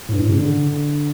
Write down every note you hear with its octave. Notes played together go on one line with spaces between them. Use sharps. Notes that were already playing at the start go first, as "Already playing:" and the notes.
A2
G2
A2
C#3
D3